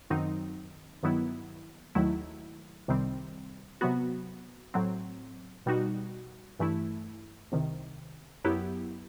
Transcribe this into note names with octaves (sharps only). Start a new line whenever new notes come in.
F#2 D#3 F#3 C4 D#4
G2 D#3 F#3 B3 E4
D#2 D#3 F#3 A3 E4
C2 C3 D#3 G3 C4
C3 F#3 B3 F#4
A2 F#3 C4
B2 G3 D#4 F#4
G2 E3 A3 E4
C2 C3 D#3
F#2 F#3 B3 E4 G4